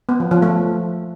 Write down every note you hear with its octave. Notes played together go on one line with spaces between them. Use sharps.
B3
F3
F3
A3